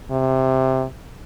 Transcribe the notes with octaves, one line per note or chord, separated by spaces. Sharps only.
C3